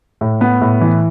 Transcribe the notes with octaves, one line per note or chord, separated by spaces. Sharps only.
A2
B3
A2
E3